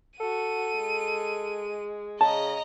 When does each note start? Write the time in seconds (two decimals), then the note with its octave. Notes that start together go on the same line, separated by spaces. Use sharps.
0.20 F#4 A4 D#7
0.77 G#3
2.21 C#3 D#5 A5 A#5